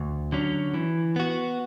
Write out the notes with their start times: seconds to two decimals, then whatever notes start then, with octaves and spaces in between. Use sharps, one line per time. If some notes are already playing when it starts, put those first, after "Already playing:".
Already playing: D2
0.32 D3 F#3 C#4
0.74 E3
1.16 B3 F#4